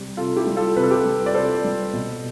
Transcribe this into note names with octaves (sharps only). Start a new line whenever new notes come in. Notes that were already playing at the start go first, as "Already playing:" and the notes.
Already playing: C3 G3
C3 F4 A4
E4 G4
G3
F4 A4
C3 B4
A4
G4 B4
G3
D5
C3 A4 C5
G3
B2